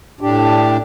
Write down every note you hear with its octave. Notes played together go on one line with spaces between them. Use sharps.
A2 D4 G4